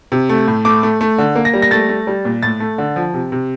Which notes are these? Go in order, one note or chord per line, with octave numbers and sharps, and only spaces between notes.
C3
A3
A2
A3 D6
A3
A3
D3
A#3
A#6
G3
A#6
A3 A6
A3
G3
A#2
A2 A6
A3
D3
F3
C3
C3